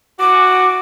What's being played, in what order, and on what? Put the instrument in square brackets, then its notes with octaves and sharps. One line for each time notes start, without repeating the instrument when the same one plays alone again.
[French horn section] E3 F#4 [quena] D6